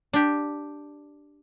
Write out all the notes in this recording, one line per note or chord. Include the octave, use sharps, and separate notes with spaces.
D4 G4